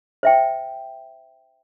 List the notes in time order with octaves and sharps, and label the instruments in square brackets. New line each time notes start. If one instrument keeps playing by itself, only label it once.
[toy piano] C5 E5 G5